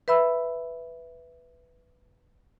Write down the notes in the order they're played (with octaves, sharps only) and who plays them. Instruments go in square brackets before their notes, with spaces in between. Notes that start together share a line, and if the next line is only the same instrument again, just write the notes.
[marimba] B4 E5 B5 E6